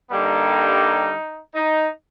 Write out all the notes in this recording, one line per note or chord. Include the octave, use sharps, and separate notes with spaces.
G2 D3 G3 A#3 D#4
D#4